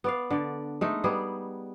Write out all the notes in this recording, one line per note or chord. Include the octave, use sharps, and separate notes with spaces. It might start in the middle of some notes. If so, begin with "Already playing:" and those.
B3 D5 F5
D3 D5
G#3 A3 D#4
G3 B3 G#4